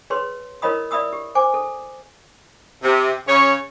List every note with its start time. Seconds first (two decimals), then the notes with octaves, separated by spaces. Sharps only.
0.10 G#4 B4 C#5 C6
0.62 E4 A#4 C#5 D#5 B5 D#6
0.91 D5 E5 B5 D#6 E6
1.13 G4
1.35 C5 G#5 D6
1.54 A4
2.83 C3
3.27 C#3 C#5